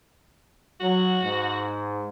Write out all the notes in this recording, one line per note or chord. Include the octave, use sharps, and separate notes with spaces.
F#3 F#4
G#2